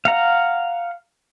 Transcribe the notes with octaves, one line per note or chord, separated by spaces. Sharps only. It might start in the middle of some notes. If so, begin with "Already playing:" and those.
F5 F#5 A#5